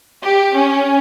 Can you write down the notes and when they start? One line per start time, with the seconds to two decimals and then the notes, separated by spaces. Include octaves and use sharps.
0.23 G4
0.56 C#4